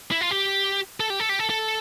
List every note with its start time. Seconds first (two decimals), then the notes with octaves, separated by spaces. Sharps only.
0.11 E4
0.21 F4
0.31 G4
1.00 A4
1.10 G4
1.20 A4
1.29 G4
1.39 A4
1.50 A4